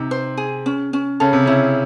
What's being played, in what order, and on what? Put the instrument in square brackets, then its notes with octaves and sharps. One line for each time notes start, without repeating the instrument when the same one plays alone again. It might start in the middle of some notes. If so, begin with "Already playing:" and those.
Already playing: [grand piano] C3 [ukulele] D#4
[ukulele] C5
G#4
C#4
C#4
[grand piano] C#3 [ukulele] A4
[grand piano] C3
[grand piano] C#3 [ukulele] E4